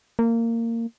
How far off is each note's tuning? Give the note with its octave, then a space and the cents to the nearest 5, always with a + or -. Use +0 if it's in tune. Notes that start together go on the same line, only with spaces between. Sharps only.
A#3 -20